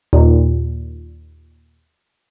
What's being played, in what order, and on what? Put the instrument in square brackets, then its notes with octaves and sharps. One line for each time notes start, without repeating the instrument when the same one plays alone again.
[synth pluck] D#2 A#2